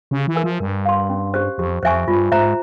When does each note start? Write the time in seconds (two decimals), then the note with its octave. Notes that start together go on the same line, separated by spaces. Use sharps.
0.11 C#3 G4
0.28 E3
0.36 A#4 E5 G#5
0.44 F3
0.60 G2 A#4
0.85 F5 C6
1.09 C#4
1.34 G4 C5
1.58 F2 G4
1.83 F2 C5 E5 G#5 C#6
2.08 G2 F4
2.32 G#2 C5 E5 A#5